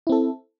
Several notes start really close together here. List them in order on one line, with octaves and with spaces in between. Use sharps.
E4 C4 A4